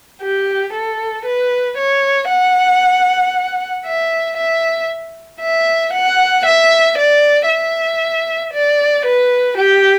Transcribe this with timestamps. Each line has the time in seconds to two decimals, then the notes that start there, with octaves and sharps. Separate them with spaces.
0.22 G4
0.73 A4
1.25 B4
1.77 C#5
2.29 F#5
3.86 E5
4.37 E5
5.41 E5
5.93 F#5
6.45 E5
6.98 D5
7.48 E5
8.53 D5
9.05 B4
9.57 G4